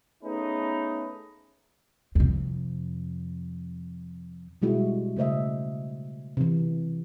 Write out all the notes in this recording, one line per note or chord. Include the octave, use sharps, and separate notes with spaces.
A3 B3 C#4 D#4 G#4 B4
F2 C3
B2 G3 G#3 E4 F#4
C#3 A3 C5 D#5 E5
C3 E3